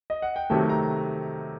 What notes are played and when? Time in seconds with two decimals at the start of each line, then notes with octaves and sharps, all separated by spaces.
0.10 D#5
0.22 F#5
0.36 G5
0.50 C3 D#3 F#3 A3 A5
0.69 A#5